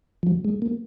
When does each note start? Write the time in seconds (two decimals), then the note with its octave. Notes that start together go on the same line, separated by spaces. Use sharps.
0.23 F3
0.27 F#3
0.45 G#3
0.62 A#3